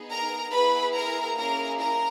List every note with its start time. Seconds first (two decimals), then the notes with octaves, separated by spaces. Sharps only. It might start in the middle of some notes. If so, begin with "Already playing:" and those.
Already playing: B3 D#4 G#4
0.11 A#4 A#5
0.53 B3 E4 G#4 B4 B5
0.95 A#4 A#5
1.37 A#3 C#4 E4 G#4 A#4 A#5
1.79 A#4 A#5